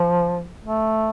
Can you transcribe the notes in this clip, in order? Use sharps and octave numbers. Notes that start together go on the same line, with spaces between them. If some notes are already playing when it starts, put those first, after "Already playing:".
Already playing: F3
A3